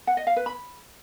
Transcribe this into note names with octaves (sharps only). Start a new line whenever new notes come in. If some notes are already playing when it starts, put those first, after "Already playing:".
F#5
D#5
F5
B4
B5